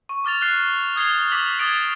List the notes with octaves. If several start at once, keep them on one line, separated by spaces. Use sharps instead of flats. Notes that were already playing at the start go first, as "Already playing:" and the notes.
C#6
D6 F6 A6 F7
F6 F#6 C7
D#6 G#6 C7 G7
D6 B6 F#7
D6 D#6 G#6 A6 D7 G7